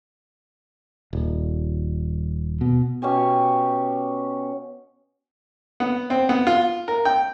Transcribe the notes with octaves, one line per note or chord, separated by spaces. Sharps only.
D#1
B2
B2 C#4 G4 G#5
B3
C4
B3
F4
A#4
G5